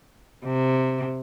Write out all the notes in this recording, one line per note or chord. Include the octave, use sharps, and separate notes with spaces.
C3